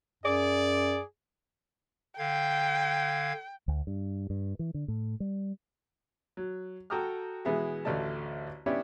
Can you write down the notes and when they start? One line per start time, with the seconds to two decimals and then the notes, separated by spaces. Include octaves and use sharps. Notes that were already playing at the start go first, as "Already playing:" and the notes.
0.23 F#2 G#4 D5
2.19 D3 F5 G5 G#6
3.68 D2
3.87 G2
4.30 G2
4.59 E3
4.74 D3
4.88 A2
5.20 G3
6.37 F#3
6.90 F#4 A4 G5 A#5 D#6 F6
7.45 B2 E3 G#3 B3 E4 G#4
7.85 A1 D2 A3 D5 D#5 A5
8.66 B3 C#4 D4 E4 G4 C#5